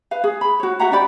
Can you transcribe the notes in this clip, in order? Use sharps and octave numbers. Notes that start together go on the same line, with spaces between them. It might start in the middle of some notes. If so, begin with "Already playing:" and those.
B4 F5
G#4
B5
F#4 C#5
F#4 E5 F#5 A#5
D4 G4 D5 B5